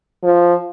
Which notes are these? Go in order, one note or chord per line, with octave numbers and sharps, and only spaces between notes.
F3